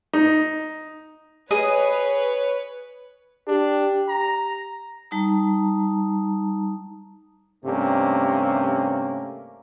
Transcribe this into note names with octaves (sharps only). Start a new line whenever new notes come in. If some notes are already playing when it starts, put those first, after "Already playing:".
D#4
G#4 B4 C#5 D#5
D4 G4
A#5
G3 D#4 A5 A#5 D#6
G2 C3 A3 A#3 C#4